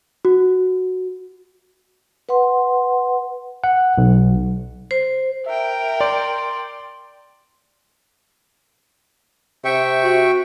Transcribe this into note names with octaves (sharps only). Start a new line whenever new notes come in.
F#4
B4 F#5 C6
F#5
B1
C5
A#4 E5 G5
D5 C6
C3 E5 G5 C#6
F#4